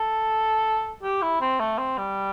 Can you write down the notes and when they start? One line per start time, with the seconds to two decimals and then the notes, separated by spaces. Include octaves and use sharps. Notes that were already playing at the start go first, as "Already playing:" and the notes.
Already playing: A4
1.03 G4
1.22 E4
1.41 C4
1.60 A3
1.78 C4
1.98 G3